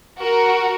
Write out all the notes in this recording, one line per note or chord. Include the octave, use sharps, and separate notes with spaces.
F#4 A#4